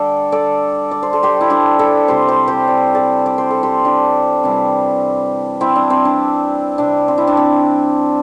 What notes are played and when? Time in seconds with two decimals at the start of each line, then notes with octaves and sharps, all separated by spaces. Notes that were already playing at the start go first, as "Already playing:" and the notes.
Already playing: D3 G3 A4 D5
0.32 A4 D5
0.91 D5
1.03 C5
1.13 A4
1.23 G4 C5
1.41 E4
1.50 D4 G4
1.79 E4 A4
2.08 C3 G3 G4 C5
2.28 G4 C5
2.48 G4 C5
2.68 D5
2.95 A4 D5
3.26 D5
3.38 C5
3.51 A4
3.63 G4 C5
3.85 D4 G4
4.43 C3 E3 G3
5.61 C4 E4
5.76 D4
5.90 C4
6.05 D4
6.78 C3 G3 D4
7.08 C4
7.18 E4
7.27 D4
7.37 C4